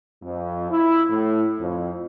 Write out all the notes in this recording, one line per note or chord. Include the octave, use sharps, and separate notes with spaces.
F2
E4
A2
F2